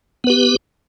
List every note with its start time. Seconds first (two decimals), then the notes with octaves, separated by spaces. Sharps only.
0.24 B3
0.27 B4
0.30 G4